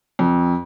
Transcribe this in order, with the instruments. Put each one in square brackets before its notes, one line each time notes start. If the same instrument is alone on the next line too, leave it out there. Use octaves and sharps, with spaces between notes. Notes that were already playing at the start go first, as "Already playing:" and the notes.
[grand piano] F2